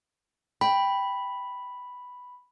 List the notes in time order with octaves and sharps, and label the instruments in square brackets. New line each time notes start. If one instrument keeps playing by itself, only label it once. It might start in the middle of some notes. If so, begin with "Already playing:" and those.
[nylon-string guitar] G5 [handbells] B5